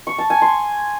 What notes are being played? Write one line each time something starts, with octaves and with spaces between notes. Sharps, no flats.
C#6
A5
G#5
C6